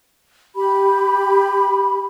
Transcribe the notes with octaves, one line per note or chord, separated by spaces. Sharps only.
G4 B5